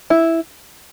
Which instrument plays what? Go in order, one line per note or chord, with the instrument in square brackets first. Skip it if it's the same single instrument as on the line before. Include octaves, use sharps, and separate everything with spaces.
[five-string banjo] E4